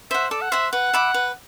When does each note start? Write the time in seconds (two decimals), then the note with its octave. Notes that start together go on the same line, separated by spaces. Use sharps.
0.11 C5 E5 F#5
0.31 A4 D5
0.41 F#5
0.52 C5 E5 F#5
0.73 B4 F#5
0.94 E5 B5 D6
1.14 B4